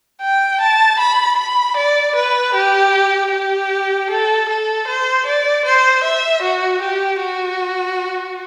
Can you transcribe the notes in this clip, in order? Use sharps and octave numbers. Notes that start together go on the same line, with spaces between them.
G5
A5
B5
B5
D5
B4
G4
G4
A4
A4
C5
D5
C5
E5
F#4
G4
F#4